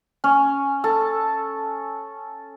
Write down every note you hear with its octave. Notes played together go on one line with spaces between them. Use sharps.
C#4
A4